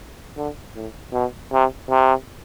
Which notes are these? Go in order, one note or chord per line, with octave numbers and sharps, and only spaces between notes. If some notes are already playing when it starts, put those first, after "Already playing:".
D3
A2
B2
C3
C3